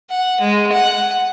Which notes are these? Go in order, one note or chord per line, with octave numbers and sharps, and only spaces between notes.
F#5
G#3
F#5